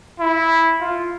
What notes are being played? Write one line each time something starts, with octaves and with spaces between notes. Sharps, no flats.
E4
F4